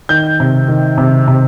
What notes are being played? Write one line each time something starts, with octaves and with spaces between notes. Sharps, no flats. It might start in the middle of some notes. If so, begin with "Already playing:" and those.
D#3 G6
C3
D#3
C3
C3